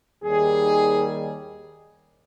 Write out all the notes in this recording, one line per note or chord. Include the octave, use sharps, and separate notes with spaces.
D#2 D#3 G3 G#4